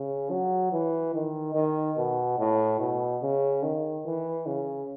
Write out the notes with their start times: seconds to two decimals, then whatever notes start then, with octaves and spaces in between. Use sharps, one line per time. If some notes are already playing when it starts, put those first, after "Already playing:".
Already playing: C#3
0.30 F#3
0.72 E3
1.14 D#3
1.55 D#3
1.97 B2
2.38 A2
2.79 B2
3.22 C#3
3.62 D#3
4.05 E3
4.46 C#3